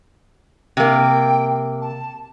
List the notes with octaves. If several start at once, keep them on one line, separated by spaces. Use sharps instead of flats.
C3 A#3 G5
A5